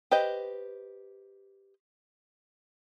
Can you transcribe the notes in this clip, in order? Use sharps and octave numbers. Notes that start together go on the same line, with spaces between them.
G4 B4 C5 D#5